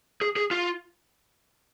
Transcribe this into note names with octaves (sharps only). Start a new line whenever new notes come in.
G#4
G#4
F4